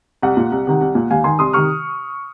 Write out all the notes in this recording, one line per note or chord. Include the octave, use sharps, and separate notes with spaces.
C2 F#5
A#2
C2
C3 D#3
C2
A#2
D#2 F5 G#5
D#3 G#5 C6
C2 C6 D#6
C3 D#3 C#6 F6